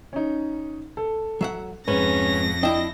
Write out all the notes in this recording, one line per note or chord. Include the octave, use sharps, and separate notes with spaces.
C#4 D#4
A4
F#3 E5 F#5
F2 G#2 C#4 B4 A#6
D4 E4 D#5 G5